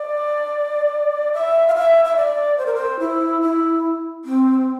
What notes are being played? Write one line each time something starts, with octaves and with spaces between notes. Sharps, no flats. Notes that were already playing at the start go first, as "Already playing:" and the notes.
Already playing: D5
E5
F5
E5
E5
D5
C5
A#4
C5
E4
E4
C4